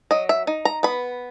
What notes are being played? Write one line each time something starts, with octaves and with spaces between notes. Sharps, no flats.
F#3 D#5
E5
D#4
A#5
B3 B5